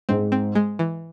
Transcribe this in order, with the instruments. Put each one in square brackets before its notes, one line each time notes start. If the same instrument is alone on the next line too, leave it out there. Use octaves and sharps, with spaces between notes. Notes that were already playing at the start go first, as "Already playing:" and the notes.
[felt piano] G#2 G#3 [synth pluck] C4
[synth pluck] C4
G#3
E3